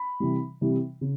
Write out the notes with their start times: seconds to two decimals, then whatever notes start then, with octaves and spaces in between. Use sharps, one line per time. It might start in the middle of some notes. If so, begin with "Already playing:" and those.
Already playing: B5
0.20 C3 E3 G3
0.61 C3 E3 G3
1.01 C#3